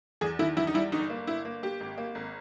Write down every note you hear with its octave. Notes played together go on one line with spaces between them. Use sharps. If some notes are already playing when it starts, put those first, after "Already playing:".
E2 G#4
D#3 E4
E2 E4
D#4
G3 E4
G1 D#4
A#3
G1 E4
A#3
A#3 G4
G#1
A#3
G#1